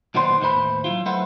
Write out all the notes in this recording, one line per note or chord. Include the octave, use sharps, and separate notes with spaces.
B1 A#2 D#3 B3 C5 C6
D#2 A2 E3 C5 B5
F#3 G#3 E4 F4
F#3 A3 E4 B4 C5 F#5